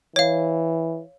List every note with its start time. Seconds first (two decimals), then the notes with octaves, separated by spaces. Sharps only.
0.16 E3 C#5 F5